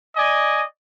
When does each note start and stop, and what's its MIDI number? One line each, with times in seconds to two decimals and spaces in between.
0.16 0.64 74
0.16 0.64 75
0.16 0.64 80